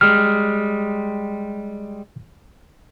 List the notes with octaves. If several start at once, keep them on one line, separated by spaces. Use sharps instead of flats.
G3 G#3 F6